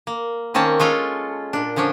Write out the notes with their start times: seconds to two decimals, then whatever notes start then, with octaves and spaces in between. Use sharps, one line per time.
0.07 A#3
0.54 D#3 A#3 C4 C#4 A5
0.79 G#3 C#4 F4 A4
1.53 A#2 D4
1.76 D3 F3 C#4 D4